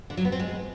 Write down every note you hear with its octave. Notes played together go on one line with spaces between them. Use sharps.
D3
F#3
B3
C4
G#3